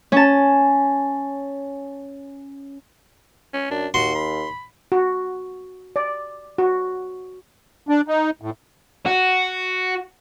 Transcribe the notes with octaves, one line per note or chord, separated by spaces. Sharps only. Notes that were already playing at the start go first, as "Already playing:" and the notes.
C#4 A5
C#4
F#2 D4
D#2 F#4 C6
B5
F#4
D5
F#4
D4
D#4
A2
F#4